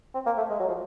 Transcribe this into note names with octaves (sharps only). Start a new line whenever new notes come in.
C4
A#3
A3
G#3
F#3
F3